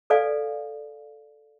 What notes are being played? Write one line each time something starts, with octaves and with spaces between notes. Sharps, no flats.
A4 B4 D5 F5 G#5